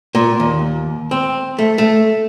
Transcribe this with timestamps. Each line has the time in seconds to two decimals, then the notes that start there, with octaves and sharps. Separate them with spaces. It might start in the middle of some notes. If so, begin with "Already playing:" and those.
0.15 A#2
0.40 D#2
1.11 C4
1.59 A3
1.78 A3